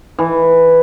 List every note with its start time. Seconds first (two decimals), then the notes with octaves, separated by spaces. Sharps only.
0.18 E3